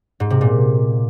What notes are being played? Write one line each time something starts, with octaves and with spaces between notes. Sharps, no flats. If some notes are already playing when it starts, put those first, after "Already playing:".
G#2
C3
A#2